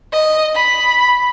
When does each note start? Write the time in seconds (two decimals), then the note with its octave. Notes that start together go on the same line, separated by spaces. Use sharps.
0.13 D#5
0.55 B5